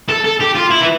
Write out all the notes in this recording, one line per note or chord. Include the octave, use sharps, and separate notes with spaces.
A4
A4
G4
F4
E4
E3